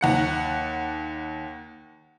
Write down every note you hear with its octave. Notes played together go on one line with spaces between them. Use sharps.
D#2 F#5 C#7